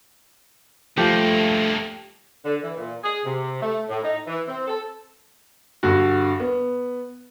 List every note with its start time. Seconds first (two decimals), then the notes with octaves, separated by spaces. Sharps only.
0.97 G2 F3 A3 A#3 G4
2.45 D3
2.62 E3
2.77 A#2
3.03 G#4
3.25 C3
3.61 A3
3.89 A2
4.03 D#4
4.27 E3
4.47 C4
4.67 A4
5.83 G2 D3 F#4
6.40 B3